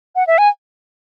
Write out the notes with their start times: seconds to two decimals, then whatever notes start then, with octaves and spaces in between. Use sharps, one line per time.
0.16 F#5
0.27 E5
0.38 G#5